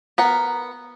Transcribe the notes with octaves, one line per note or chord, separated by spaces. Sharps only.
B3 A#4 F#5